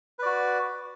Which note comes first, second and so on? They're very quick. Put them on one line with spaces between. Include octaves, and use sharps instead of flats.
B4 D5 F#4